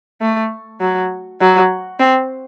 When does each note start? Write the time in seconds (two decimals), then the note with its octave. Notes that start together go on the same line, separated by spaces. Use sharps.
0.21 A3
0.80 F#3
1.41 F#3
2.00 C4